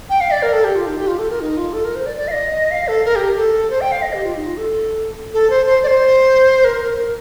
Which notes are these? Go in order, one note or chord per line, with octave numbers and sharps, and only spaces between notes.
G5
F5
D5
A#4
A4
G4
F4
D#4
G4
F4
A4
A#4
D#4
F4
A4
A#4
C5
D5
D5
F5
D#5
F5
A4
A#4
G4
A4
C5
G5
F5
D#5
G4
F4
D#4
F4
A4
A4
C5
C5
D5
C5
A#4
A#4
A#4